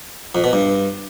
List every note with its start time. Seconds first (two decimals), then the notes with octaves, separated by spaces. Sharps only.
0.35 F2
0.44 B2
0.53 G2